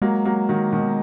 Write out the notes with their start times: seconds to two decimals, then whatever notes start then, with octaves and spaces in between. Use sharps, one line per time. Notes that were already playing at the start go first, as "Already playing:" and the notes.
0.02 F#3 G#3 A#3
0.25 F#3 A#3
0.49 D#3 F#3
0.72 B2 D#3